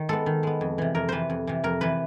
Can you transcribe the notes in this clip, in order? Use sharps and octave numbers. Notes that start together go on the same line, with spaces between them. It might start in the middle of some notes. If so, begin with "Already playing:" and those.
Already playing: D#3
G#3 B3 A4
D#3
G#3 B3
F2
C3 E3
F2 A#4
C3 E3 B4 C5
F2
C3 E3
F2 A#4
C3 E3 B4